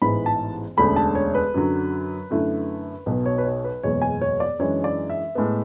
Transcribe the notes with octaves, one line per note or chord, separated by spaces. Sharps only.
A1 G#2 E3 B3 B5
A5
E1 D2 D3 A3 C#4 B5
A5
C#5
B4
F#2 D3 F#3
F#2 D3 A3 E4
B1 B2 F#3 B3 B4
C#5
B4
C#5
B4
F#1 E2 B2 G#3 B3 C#5
G#5
C#5
D5
F#2 E3 G#3 D4 C#5
D5
E5
A2 G#3 B3